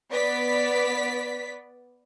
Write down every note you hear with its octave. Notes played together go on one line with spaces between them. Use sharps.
B3 D5 B6